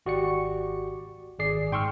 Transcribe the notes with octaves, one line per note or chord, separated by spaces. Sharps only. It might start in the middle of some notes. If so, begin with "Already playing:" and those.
G#1 F#4 G4 D5 C#6 C#7
G#1 G#4 D5 C7
G#2 G5 C6 C#6 E6 F6